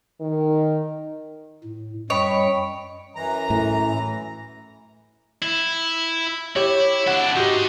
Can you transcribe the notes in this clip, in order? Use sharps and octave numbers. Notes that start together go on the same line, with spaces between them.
D#3
A2
F#2 G3 C#5 D#5 G5 B5
F#2 E3 A#5
A2
E4
E4 G4 C#5
D4 E4 F#5
D#4 F#4 G4 C5